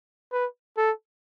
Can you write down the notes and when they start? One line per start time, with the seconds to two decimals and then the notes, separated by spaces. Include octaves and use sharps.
0.32 B4
0.77 A4